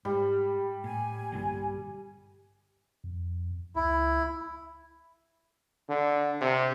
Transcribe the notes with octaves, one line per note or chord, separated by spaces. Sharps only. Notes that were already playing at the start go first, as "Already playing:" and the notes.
G#2 G3
A2 G#5
A#1 G2 D3
F2
C#2 E4
D3
C3